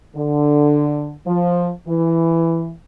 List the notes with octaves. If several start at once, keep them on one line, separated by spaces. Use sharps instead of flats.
D3
F3
E3